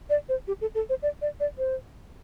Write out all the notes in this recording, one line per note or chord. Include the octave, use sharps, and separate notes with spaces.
D5
C5
G4
A4
A4
C5
D5
D5
D5
C5